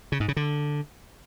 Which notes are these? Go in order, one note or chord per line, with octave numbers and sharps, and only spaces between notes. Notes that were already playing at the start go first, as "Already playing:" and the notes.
C#3
G#2
C#3
D3